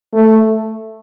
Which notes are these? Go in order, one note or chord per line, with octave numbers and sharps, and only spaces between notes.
A3